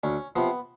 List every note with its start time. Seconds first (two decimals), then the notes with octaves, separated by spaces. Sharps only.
0.03 D2 C#4
0.36 C3 F3 B3